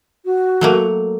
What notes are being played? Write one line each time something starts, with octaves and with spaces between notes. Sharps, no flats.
F#4
F#3 A3 A#3